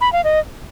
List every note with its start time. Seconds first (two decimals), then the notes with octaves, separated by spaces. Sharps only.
0.01 B5
0.13 F5
0.24 D#5